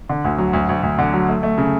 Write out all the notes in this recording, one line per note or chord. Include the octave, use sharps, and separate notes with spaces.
D3
D2
F#3
D2
D2
D2
D3
F#3
A3
A3
C#3